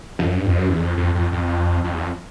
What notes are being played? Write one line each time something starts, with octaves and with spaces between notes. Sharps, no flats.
F2
F#2
G2
F2
F#2
E2
F2
F2
F2
F2
F2
E2
F2